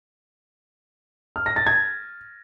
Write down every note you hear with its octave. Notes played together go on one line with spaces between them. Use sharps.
F6
A#6
A6
G#6